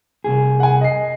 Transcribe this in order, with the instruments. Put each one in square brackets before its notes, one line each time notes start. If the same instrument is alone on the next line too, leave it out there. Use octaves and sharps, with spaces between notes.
[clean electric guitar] C2 F2 G#4
[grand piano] F#5 G#5
D#5 C7